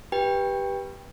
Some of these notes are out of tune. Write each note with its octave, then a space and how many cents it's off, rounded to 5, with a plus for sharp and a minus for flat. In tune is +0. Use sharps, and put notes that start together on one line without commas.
G4 +0 B4 -20 G5 +20